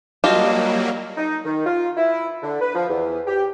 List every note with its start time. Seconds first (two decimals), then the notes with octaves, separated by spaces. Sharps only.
0.24 F#3 G3 A#3 F4 G4 D#5 A5
1.17 D#4
1.45 D#3
1.66 F4
1.97 E4
2.42 D3
2.60 B4
2.75 F3
2.89 E2
3.27 G4